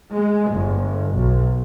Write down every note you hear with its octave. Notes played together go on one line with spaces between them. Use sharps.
G#3
G1
B1